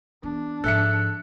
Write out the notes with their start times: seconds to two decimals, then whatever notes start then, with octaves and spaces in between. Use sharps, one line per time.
0.23 E2 D4
0.64 G#2 F3 A4 E5 F#6 C#7